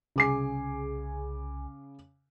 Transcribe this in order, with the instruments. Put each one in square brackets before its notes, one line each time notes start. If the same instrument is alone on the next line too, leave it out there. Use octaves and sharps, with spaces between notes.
[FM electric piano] C2 G#4 G#5 [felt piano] C#3 D6 C7